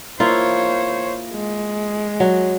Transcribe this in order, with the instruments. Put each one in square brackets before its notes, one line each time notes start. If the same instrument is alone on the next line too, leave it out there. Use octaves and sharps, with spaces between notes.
[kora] A#3 E4 F4 [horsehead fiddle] C5 C#5
[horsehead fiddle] G#3
[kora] F#3